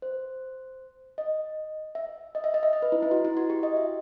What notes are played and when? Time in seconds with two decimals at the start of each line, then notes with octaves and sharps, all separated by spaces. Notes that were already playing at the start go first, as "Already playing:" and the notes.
0.02 C5
1.18 D#5
1.95 E5
2.35 D#5
2.44 E5
2.54 D#5
2.63 E5
2.73 D#5
2.82 B4
2.92 E4
3.03 E4
3.11 F#4
3.25 E4
3.37 F#4
3.50 G4
3.63 D#5
3.77 E5